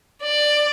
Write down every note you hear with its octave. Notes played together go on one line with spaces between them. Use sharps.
D5